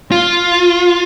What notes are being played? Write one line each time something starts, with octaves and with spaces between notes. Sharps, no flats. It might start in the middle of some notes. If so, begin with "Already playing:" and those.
F4